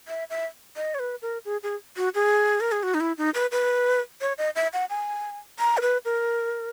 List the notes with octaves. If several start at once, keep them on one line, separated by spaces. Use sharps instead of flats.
E5
E5
D#5
C#5
B4
A#4
G#4
G#4
F#4
G#4
A#4
G#4
F#4
D#4
E4
D#4
B4
B4
C#5
D#5
E5
F#5
G#5
A#5
A#4
B4
A#4